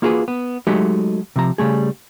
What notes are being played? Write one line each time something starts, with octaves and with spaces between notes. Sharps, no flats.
A#3 F4 F#4 G#4 A#4 B4
B3
F#3 G#3 A3 D#4 F#4 G4
C3 F3 A#5
C#3 G3 A3 G#4